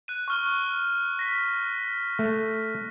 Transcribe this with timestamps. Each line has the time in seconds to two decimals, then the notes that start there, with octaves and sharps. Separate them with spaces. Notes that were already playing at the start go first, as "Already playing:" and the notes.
0.08 F#6 D#7
0.28 C#6 F6 G7
1.19 A#6 B6
2.19 A3